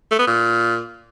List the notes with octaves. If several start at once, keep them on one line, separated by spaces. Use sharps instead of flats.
A3
B3
A#2